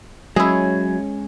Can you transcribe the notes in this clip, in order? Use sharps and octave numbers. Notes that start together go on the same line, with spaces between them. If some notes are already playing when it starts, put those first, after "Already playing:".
F#3 G#3 C#4 E4 G#4